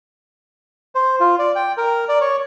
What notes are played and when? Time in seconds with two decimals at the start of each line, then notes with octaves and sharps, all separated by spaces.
0.95 C5
1.20 F4
1.39 D5
1.55 G5
1.77 A#4
2.09 D5
2.21 C#5